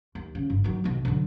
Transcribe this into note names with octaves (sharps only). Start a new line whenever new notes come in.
D#2
C#3
G1
D#3 F#3
B1 B2
D3 F#3